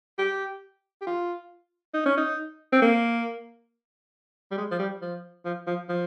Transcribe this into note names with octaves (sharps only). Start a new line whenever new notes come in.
G4
G4
F4
D#4
C#4
D#4
C4
A#3
G3
G#3
F3
G3
F3
F3
F3
F3